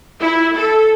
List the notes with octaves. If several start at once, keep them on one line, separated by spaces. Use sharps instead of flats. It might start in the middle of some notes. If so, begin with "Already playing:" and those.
E4
A4